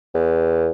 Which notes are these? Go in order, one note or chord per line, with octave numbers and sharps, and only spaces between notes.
E2